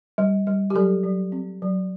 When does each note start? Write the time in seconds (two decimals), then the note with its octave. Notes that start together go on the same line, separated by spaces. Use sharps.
0.18 G3
0.47 G3
0.70 G4
0.75 F#3 A4
1.04 F#3
1.32 C4
1.62 F#3